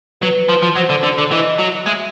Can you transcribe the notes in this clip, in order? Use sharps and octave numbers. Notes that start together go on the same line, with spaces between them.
F#3 B4
F3
F3
F#3 C5
D3
D3
D3
E3 D#5
F#3
G#3 E5